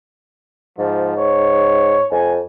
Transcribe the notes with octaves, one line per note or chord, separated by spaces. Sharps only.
G#2 F3
C#5
F2 G#5